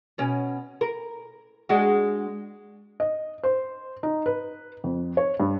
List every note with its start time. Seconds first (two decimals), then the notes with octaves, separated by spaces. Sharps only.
0.18 B2 C#4
0.81 A#4
1.69 G#3 D4 F#4
3.00 D#5
3.43 C5
4.03 D#4
4.26 B4
4.84 F2
5.17 C#5
5.40 G2